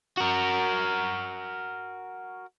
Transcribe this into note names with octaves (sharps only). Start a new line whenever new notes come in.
F#4 A#4